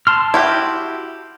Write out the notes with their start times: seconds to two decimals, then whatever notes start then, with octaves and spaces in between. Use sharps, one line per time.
0.07 A5 C6 F6
0.34 E4 F#4 G4